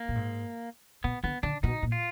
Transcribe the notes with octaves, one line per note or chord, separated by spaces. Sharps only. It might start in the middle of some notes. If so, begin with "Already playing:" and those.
Already playing: A#3
A#2
G#2
B2 B3
D3 B3
D3 D4
B2 D#4
A#2
F4